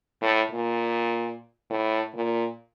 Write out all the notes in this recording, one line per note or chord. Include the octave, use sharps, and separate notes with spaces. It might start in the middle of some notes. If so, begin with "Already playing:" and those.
A2
A#2
A2
A#2